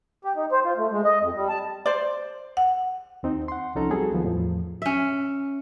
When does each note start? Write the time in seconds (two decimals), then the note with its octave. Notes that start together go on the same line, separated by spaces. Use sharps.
0.25 G4
0.36 D#4
0.52 C5
0.65 F4
0.78 A3
0.91 G#3
1.05 D#5
1.20 F2
1.36 G3
1.49 A5
1.86 C5 D5
2.57 F#5
3.23 D#2 C4 D#4
3.48 F#5 C6
3.75 C2 F3 C#4 D#4 A4 A#5
3.90 F#3 G3 C4 F#4 G#4 A4
4.11 D2 D#3 F3 B3
4.24 E2 A2 F3
4.82 C#4 E5